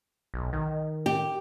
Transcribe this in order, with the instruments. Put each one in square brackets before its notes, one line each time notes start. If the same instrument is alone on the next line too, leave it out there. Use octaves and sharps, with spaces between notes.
[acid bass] B1
D#3
[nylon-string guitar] G4